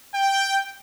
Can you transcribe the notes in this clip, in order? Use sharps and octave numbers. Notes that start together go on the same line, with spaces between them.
G5